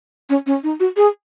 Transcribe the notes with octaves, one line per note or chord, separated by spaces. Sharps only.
C#4
C#4
D#4
F#4
G#4